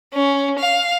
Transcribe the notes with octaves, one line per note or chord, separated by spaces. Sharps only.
C#4
F5